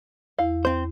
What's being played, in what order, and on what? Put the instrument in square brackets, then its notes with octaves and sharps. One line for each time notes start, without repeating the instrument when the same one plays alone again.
[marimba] E2 E4 [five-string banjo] F5
[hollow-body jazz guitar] C4 C5